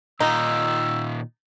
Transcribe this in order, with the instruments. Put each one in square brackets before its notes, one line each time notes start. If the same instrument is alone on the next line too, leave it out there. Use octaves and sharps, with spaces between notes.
[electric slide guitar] A#2 D#3 F4 [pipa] D#4 [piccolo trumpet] E6